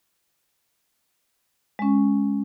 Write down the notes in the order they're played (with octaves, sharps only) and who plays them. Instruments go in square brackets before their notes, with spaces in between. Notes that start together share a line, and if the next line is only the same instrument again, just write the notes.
[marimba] G#3 C#4